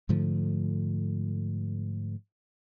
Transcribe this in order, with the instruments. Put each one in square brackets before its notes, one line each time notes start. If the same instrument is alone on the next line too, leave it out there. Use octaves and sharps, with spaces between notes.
[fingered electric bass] G#2 D3 F3 A3